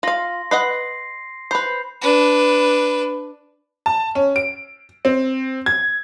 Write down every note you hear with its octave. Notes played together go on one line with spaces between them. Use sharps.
F4 F5 C6 A#6
B4 D#5 F#5 C7
B4 C5 B5 G6 C7
D4 B4
A5
C#4
D7
C4
G#6